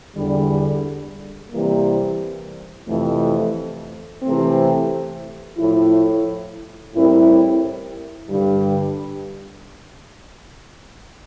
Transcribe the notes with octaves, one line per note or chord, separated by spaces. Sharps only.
E2 D3 G3
C3 E3 G3 A#3
F2 C3 E3 A3
C3 E3 A3 C4
A2 F3 A3 E4
A2 G3 C4 E4 A#4
G2 D3 G3